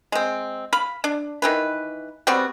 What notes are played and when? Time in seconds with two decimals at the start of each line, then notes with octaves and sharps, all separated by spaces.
0.12 G#3 C4
0.73 F5 B5
1.04 D4
1.42 D#3 E3 B4
2.27 G3 B3 C4 F#4